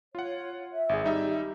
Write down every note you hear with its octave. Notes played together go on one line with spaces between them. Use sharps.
F4 C#5 F#5
E5
G#1 G#4
G3 D#4 G4 E5